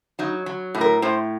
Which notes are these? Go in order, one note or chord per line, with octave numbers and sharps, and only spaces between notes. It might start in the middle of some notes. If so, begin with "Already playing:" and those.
F#3 D#4
F#3
A2
A#4
A2 C5